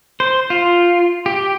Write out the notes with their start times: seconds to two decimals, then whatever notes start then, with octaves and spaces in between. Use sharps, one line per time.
0.20 C5
0.50 F4
1.26 G4